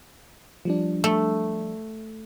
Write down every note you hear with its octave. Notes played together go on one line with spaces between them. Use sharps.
F3 G3 D4
A3